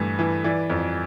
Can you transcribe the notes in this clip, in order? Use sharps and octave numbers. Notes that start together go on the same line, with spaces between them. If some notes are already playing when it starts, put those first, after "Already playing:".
Already playing: G2 E3 A3
E3
E3 D5
F2